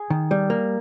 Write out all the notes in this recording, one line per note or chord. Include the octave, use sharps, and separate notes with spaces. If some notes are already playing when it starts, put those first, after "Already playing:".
Already playing: G#4
D#3
G3
A#3